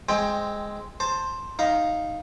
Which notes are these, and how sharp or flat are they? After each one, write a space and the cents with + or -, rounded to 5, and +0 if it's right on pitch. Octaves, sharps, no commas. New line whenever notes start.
G#3 +0 C4 +0 G5 +20
C5 +10 A5 +15
D#4 +0 F5 +0